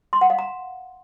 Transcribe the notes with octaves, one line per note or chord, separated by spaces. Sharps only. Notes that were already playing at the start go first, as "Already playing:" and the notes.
C6
F#5
F5
A#5